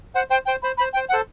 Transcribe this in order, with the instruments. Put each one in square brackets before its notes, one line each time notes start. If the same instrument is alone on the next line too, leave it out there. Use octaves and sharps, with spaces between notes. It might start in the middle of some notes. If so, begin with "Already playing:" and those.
[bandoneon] C5 [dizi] F#5
[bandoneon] C5 [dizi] G5
[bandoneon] C5 [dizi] G5
[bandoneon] C5 [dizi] B5
[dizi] B5
[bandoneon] C5
[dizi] G5
[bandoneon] C5
[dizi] F#5
[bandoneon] A4 C5